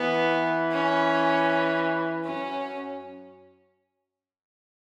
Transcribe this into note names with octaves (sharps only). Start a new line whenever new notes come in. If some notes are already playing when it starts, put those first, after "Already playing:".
Already playing: E3 B3
C#4
F#2 C#4